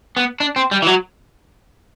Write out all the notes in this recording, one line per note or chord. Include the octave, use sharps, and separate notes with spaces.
B3
D4
C4
G3
E3
F#3